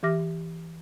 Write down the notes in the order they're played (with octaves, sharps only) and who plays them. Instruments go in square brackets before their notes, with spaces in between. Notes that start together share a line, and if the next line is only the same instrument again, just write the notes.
[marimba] E3 G4 E5 D6 F6 A#6